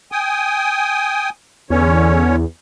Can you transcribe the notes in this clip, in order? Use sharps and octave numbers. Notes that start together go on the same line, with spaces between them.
G5 G#5 D#6
E2 D3 C#4 C#5